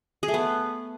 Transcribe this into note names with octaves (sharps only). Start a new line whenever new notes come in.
G#4
A3
B3